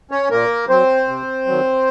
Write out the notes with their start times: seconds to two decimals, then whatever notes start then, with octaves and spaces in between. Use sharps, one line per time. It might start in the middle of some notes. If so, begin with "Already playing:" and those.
0.11 C#4 C#5
0.31 A#2 A#3 A#4
0.69 F#3 C4 C5
1.08 C3
1.46 D#3 F#3